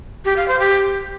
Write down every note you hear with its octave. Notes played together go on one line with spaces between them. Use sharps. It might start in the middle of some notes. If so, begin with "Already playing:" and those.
G4
F5
C5
G4